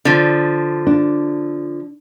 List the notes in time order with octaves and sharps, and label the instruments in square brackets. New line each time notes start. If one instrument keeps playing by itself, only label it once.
[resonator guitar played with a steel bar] D3 F3
[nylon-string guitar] D4